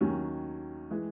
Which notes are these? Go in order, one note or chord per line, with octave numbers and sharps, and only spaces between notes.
D#2 D#3 F#3 C#4
E3 G#3